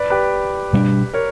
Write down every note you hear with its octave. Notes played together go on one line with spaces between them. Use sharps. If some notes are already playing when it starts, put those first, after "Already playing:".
Already playing: B4 D5
G4 B4
B2 G3 B3 D4
A#4 C#5